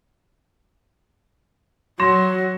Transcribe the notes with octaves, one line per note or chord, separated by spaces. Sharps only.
F#3 C6 A#6 E7